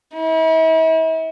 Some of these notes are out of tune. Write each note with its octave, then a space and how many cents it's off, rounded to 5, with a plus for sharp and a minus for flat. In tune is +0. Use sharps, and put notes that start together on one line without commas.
E4 -40